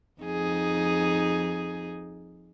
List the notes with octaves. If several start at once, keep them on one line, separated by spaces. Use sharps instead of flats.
F2 D#4 G#4